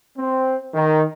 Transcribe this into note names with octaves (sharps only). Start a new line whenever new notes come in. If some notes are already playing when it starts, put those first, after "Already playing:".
C4
D#3